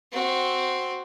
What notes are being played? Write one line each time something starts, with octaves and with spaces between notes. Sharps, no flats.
C4 F#4